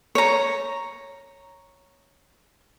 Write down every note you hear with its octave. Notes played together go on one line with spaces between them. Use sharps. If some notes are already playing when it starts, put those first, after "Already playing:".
C#5 A#5